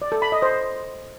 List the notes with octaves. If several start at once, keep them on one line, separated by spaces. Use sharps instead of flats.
D5
A4
B5
D#5
C5